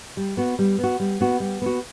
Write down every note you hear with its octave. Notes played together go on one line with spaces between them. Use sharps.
G3
B3 F#4
G3
B3 F#4
G3
B3 F#4
G3
B3 F#4